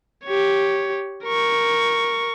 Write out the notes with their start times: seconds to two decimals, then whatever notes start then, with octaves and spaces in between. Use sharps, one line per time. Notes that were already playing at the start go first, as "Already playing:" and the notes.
0.24 G4 C#5
1.25 A#4 C#6